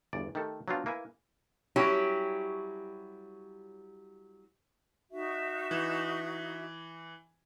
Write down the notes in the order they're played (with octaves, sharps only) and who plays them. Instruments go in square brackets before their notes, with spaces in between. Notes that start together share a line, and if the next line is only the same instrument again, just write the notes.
[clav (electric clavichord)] G1 E2 D5
D#3 A3 G4 A4
F#3 B3 C4 D4 F4
A#3 E4 B4 G#5
[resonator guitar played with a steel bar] F#3 G3 C#4 E4 G4
[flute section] D#4 F#4 E5
[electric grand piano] E3